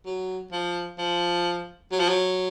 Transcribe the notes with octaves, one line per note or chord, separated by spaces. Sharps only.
F#3
F3
F3
F#3
F3
F#3